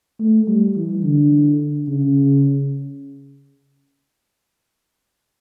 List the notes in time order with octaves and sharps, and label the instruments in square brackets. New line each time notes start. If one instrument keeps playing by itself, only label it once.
[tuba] A3
G3
E3
D3
C#3